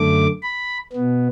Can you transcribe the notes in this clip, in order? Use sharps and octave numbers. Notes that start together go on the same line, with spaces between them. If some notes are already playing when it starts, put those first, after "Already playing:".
Already playing: F#2 D3 A3 D6
B5
B2 B3